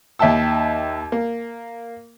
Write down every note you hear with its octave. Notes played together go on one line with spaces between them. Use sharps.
D#2 E5 G5 A5 E6
A#3